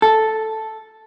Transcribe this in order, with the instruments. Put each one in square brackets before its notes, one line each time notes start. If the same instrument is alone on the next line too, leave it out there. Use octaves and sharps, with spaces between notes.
[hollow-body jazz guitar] A4